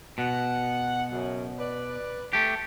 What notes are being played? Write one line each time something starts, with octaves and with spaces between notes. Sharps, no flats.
B2 F#5
F#2 C#3
B4 D5
A3 G4